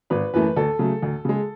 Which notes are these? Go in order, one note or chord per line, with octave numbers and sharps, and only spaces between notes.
G#1 B4
F#2 E3 A3 B4
D2 A4
C#3 F#3 A3
D2
C#3 G#3